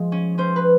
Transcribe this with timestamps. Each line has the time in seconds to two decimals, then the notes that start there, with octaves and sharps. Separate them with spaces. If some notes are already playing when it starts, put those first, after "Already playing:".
Already playing: F3 G#3
0.12 C#4
0.38 C#4 C5
0.56 B4